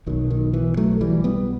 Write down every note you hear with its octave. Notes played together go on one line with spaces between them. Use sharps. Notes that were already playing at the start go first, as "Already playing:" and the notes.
B1 B2 D#3 F#3
D#3
E3
F#3 A3
E3 G3
G3 B3